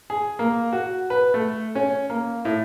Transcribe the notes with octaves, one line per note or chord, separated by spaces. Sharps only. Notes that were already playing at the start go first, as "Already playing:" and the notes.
G#4
A#3
F#4
B4
A3
C#4
A#3
A2